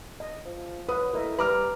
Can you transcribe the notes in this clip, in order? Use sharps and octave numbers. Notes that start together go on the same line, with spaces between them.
D#5
F3
F#3 B4 D#6
A2 A#4 D#5 E5
G3 B4 A#5 D6 F6